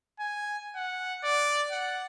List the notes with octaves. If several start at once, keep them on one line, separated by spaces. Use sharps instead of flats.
G#5
F#5
D5
F#5